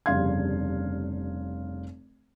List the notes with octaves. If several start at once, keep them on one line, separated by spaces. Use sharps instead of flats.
F1 G2 C#3 F5 C6 G#6